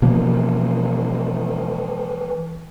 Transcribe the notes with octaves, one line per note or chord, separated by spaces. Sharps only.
B2 E3 F3 A#3